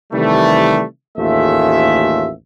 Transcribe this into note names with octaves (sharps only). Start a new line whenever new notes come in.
C3 D#3 E3 G3 A3
A1 D#2 A3 F4 G#4 E5